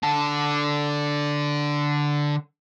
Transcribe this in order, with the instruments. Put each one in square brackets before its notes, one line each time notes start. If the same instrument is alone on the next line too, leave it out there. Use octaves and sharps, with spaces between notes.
[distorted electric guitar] D3 A5